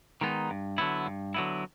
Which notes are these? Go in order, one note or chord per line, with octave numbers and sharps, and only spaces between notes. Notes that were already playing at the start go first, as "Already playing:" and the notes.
D#3 G#3 B3 D#4
G2
D3 F#3 B3 E4
G2
D3 F#3 B3 E4